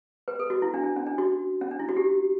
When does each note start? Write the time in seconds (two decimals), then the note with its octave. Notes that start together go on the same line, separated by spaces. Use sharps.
0.28 B4
0.39 A4
0.50 F#4
0.62 E4
0.74 D4
0.84 D4
0.96 C#4
1.06 D4
1.18 F#4
1.61 C#4
1.71 D4
1.79 E4
1.89 F#4
1.97 G4